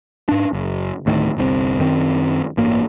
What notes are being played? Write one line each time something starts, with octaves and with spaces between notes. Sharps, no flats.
G#2 D4
F#1
D2 A2 D#3
G1 C2 C3 C4
F#2 D#3 C4
A1 G2 A#3